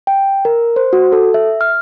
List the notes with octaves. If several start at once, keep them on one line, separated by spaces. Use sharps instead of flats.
G5
A#4
C5
F#4
A4
E5
F6